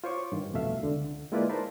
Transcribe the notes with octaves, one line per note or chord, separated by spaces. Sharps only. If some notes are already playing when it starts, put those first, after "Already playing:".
F4 C5 C#5 C#6 D6
G2 D#3
C2 F2 B2 A3 E5 F5
C#2 D3
G#3 A#3 E4 F4 B4 D5
D#4 A#4 C5 A5 B5